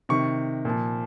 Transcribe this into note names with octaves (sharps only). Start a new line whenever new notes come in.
C3 D#3 C#6
A#2 F3